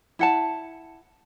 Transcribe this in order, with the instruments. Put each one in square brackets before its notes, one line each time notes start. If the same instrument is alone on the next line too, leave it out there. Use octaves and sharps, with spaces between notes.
[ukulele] E4 F#5 A5